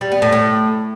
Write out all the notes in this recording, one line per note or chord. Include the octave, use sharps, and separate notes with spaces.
G3
B3
A2
A2